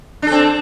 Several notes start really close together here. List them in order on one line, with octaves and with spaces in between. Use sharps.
D4 A4 C4